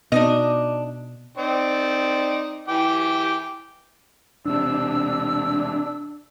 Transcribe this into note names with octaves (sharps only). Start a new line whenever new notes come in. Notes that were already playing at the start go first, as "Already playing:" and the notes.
B2 D4 D#4 D#5
C4 D#4 D5
E3 G5 D6
E1 C3 D4 E6